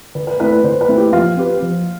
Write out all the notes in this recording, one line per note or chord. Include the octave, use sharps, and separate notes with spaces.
D3 B4
B4
A3 C4 E4 B4
B4
D3 C5
B4
A3 C4 E4
G4
F3 F4
C4 G4 B4
F3